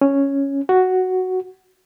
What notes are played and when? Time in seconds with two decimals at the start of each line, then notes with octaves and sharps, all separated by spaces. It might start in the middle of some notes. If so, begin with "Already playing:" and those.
0.01 C#4
0.69 F#4